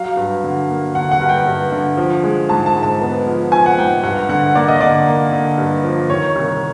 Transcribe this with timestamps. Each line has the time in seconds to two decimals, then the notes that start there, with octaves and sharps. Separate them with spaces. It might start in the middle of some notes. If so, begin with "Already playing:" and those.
Already playing: F#3 F5
0.17 G2
0.44 D3
0.69 A#3
0.95 D3 F#5
1.11 F#5
1.20 G2
1.29 G5
1.46 G2
1.72 D3
1.97 F3
2.24 G#3
2.49 G#2 A5
2.66 A5
2.75 G#2
2.83 A5
3.01 B3
3.26 F3
3.52 F3 G#5
3.66 F#5
3.78 G#2 G5
4.03 G2 F#5
4.29 D3 F#5
4.55 A#3 D5
4.68 D#5
4.80 D3 D5
5.07 A#3
5.32 D3
5.58 G2
5.83 F3
6.10 D#3 C#5
6.35 C2